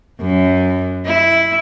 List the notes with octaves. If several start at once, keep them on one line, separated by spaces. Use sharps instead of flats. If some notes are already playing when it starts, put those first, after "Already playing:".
F#2
E4